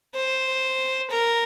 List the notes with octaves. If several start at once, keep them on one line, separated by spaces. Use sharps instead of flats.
C5
A#4